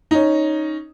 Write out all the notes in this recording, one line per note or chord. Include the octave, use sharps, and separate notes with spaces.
C#4 D#4